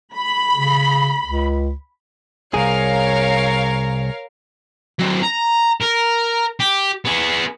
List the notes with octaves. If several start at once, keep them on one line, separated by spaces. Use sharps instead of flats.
B5
C#3
C#2
C2 G2 G#4 A#4 C#5 F5
F#3 C4
A#5
A#4
G4
B3 G#4